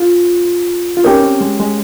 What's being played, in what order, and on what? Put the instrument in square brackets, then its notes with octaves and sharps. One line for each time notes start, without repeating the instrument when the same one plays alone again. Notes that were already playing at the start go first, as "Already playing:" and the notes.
Already playing: [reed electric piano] F4
F4
[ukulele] C#4 G4 A#4 C#5 [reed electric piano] D#4
[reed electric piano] C4
G#3
G#3